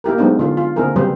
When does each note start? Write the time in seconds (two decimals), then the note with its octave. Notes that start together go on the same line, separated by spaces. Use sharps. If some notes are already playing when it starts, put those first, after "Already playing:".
0.04 A#3 E4 G4 A#4
0.18 F#3 G#3 B3 C4 D4 D#4
0.39 D3 F4
0.57 F4
0.76 D3 A#3 C4 E4 G#4 A#4
0.96 C#3 F#3 G3 C4 B4 C5